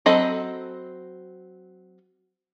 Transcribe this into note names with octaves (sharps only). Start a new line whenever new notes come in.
F#3 C4 A4 D#5 B5